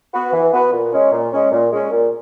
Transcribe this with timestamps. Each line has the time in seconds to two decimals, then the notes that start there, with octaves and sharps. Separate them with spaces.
0.13 B3 F#4 B4
0.33 E3
0.52 B3 F#4 B4
0.72 A#2
0.92 G#3 C#4
1.11 A#2
1.32 G#3 C#4
1.51 A#2
1.71 G#3 C#4
1.91 A#2